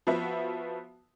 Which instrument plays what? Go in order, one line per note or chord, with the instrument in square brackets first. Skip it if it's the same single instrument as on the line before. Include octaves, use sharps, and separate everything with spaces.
[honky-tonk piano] F3 B3 F#4 E5